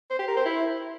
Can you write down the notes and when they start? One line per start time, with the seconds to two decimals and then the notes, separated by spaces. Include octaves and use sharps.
0.10 C5
0.19 G4
0.28 A#4
0.37 C5
0.45 E4